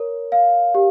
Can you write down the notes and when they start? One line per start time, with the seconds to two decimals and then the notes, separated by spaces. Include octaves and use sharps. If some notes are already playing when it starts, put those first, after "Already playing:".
Already playing: A#4 C#5
0.32 F5
0.75 G4